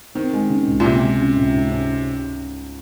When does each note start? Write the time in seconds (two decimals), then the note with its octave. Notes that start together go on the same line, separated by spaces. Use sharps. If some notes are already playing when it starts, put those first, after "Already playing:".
0.15 D#3 C4
0.33 G#3
0.49 C#3
0.67 C#2
0.80 A#2
0.85 C3 C4
1.02 G#3
1.19 C#3
1.36 C#2
1.54 G#2
1.71 C#4